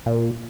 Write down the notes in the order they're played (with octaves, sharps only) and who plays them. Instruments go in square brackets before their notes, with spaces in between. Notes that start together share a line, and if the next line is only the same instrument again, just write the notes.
[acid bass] A#2